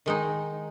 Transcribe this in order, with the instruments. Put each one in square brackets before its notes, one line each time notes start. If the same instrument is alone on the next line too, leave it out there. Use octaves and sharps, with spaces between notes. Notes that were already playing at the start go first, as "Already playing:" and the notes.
[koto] D#3 G#3 D#4